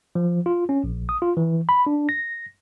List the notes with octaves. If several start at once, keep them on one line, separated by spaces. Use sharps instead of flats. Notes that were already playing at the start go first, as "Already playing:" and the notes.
F3
F4
C#4
A#1
D#6
F4
E3
B5
D4
A#6